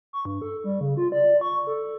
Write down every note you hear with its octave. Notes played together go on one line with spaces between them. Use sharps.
C#6
G2
A4
G3
C#3
F4
D5
C#6
A4